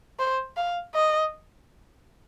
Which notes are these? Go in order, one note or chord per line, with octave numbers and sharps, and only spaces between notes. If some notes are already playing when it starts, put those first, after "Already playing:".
C5
F5
D#5